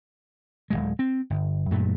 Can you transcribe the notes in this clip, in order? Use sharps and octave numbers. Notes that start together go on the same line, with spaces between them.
D1 G#1 G#3
C4
G1
F#2 A#2 F#3 A3